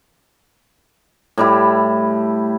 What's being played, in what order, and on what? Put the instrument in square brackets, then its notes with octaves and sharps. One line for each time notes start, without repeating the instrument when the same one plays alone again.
[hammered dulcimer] A2 G3 E4